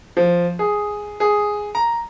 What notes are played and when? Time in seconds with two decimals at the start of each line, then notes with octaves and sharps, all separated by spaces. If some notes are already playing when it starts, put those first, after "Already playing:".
0.17 F3
0.59 G#4
1.20 G#4
1.75 A#5